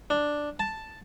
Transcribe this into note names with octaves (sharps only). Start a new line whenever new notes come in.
D4
A5